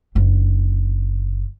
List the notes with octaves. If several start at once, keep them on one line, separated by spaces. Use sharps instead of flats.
F#1 D4